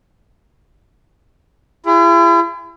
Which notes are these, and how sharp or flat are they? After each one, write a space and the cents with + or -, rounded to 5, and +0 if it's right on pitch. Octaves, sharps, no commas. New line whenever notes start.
E4 +40 G#4 -35